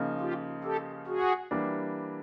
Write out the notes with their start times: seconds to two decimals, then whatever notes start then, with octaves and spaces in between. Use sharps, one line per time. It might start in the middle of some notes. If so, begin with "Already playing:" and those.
Already playing: C#3 F3 A#3 D#4
0.20 F4 G4
0.64 G4 A4
1.07 F#4 G#4
1.51 E3 G3 A#3 D4